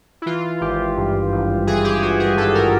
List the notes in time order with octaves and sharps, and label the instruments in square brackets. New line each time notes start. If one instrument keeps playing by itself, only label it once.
[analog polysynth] E4
E3 F4
G#1 G4
G2
G#1
E3 G#4
G4
G#1 F#4
G#4
G2 A4
A#4